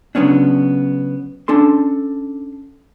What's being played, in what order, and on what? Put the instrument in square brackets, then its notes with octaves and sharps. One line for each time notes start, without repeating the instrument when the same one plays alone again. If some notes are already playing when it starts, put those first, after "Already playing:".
[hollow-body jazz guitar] C#3 F#3 G#3 B3 C#4 D4
C#4 D4 A4 C6